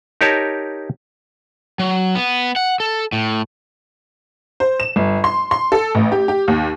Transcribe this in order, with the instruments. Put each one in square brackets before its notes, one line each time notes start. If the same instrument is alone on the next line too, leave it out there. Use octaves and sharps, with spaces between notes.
[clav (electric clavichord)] D#4 G4 A#4 C#5 A5
[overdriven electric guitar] F#3
B3
F#5
A4
A2
[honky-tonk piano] C5
E7
G1
C6
C6
A4
A1
G4
G4
D#2